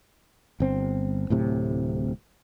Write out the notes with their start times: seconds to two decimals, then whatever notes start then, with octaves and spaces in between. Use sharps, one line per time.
0.60 G1 C4
1.30 D1 A2 C3